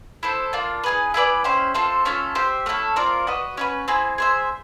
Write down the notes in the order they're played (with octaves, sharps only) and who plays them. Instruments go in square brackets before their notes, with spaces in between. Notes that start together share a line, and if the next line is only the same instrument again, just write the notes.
[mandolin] E4 A4 C5
A#3 D4 F4
D#4 G#4 B4
E4 G#4 B4 D5
C#4 E4 G4 C5
C4 F4 A4 C5
A3 C#4 F4 A4
G4 C5 E5
A3 C#4 E4 A4
C4 F4 A#4 D5
F#4 B4 D#5
C#4 F#4 B4
C4 E4 G#4
G#4 C5 E5